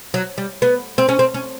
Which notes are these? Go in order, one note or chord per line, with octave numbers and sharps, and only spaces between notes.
F#3
G3
B3
C4
C#4
C4
C#4